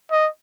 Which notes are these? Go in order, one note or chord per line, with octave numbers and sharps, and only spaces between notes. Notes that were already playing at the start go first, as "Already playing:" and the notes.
D#5